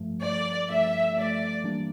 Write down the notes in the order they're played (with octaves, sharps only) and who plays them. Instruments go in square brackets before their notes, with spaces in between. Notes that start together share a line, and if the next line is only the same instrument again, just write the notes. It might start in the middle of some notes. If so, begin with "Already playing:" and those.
Already playing: [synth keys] G2 F3 A3
[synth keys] G2 F3 A3 [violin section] D5
[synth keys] G2 F3 A3 [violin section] E5
[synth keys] G2 F3 A3 [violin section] D5
[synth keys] E3 G3 A#3 D4